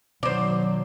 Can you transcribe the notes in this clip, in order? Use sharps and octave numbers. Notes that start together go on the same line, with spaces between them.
B2 D#3 F#3 C5 D5